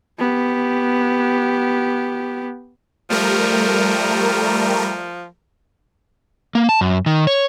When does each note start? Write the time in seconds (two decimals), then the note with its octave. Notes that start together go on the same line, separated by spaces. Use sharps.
0.19 B3 G4
3.10 F3 G3 A3 A#4
6.55 A#3
6.69 A5
6.81 F#2
7.06 D#3
7.27 C#5